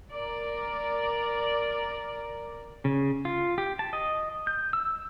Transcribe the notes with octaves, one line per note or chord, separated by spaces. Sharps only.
A#4 D5
C#3
F4
G4
A5
D#5
G6
E6